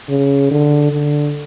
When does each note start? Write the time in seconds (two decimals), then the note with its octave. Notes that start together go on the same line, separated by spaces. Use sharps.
0.09 C#3
0.51 D3
0.92 D3